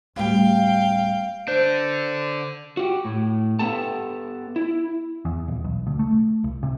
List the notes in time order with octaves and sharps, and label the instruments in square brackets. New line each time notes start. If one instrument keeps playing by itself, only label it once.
[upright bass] D1 G3 [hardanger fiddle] F5 G5
[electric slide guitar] D3 D4 [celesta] C5 G6
[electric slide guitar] F#4 G4
A2
B3 G4 A4 A5
E4
[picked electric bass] E2
D#1
B1
D2
A3
C2
C3